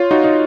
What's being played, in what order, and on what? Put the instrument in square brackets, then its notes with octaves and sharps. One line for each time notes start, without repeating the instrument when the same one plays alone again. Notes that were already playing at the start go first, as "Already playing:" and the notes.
Already playing: [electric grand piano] F4 [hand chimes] C#5
[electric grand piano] D#4 F#4
D#4